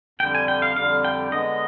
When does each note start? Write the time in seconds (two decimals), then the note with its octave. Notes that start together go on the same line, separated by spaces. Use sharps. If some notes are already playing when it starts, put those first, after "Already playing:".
0.19 F2 D3 G3 G5
0.35 G#5
0.48 G5
0.62 F5
0.76 F2 D3 G3 F5
1.04 G5
1.32 D3 G#3 B3 D#5